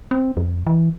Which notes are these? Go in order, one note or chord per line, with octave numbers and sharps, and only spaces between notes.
C4
F2
E3